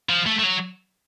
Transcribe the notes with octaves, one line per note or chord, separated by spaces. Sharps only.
F3
A3
A3
F#3